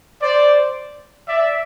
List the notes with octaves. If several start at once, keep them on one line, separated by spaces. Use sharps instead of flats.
C5 D5
D5 E5